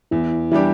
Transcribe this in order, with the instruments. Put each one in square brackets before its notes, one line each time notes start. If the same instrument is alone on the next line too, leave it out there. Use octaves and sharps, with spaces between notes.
[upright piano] E2 [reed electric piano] E4
[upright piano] E3 G3 D4 G4 [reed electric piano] E4